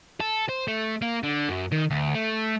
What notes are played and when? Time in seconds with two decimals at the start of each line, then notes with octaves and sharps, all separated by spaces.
0.20 A4
0.49 C5
0.68 A3
1.02 A#3
1.24 D3
1.49 F#2
1.72 D#3
1.90 D2
2.15 A3